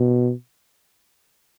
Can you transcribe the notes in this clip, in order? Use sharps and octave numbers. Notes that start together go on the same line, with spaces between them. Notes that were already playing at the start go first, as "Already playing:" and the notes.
Already playing: B2